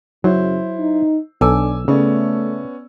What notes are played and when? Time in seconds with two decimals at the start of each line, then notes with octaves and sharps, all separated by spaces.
0.24 F#2 C#3 F#3 E4 C5
0.79 D#4
1.41 B1 D4 A4 G#5 D6 E6
1.88 C#3 A3 B3 C#4 D5